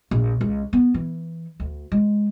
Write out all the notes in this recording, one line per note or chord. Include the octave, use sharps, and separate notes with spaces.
A#1
C#2
B3
E3
D2
G#3